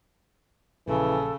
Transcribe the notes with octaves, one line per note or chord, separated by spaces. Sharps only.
A#1 C#3 E3 A4